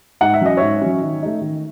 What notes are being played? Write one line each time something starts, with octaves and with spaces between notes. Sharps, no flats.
G#2 F#5
E5
F#3 C#4 D#5
G#2 C#5 E5
F#3 C#4
D#3
A3 D#4
D#3